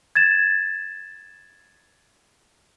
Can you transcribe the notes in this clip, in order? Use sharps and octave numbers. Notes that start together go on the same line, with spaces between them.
G#6 A6 E7